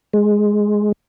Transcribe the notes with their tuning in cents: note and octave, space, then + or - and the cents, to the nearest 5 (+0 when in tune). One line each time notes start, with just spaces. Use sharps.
G#3 +5